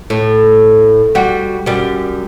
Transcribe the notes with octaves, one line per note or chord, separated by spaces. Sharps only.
A2
G3 F#4
F#2 G3